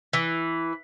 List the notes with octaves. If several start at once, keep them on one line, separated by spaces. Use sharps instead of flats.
E3